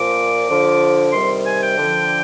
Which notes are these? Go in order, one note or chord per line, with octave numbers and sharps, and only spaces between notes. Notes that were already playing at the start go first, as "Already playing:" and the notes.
Already playing: A#2 F3 D6
D3 F3
C3 D#3 G3 C6
G#5
G5
D3 F3